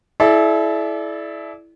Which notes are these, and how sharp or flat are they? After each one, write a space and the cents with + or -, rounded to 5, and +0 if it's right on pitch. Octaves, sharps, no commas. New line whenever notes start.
E4 +0 A4 -45 D5 +5